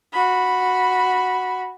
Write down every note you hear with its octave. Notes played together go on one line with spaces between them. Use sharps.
F#4 B5